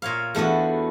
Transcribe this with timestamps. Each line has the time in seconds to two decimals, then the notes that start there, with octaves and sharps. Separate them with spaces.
0.02 A#2 C#5 F5
0.35 E2 A3 B3 D4 F#4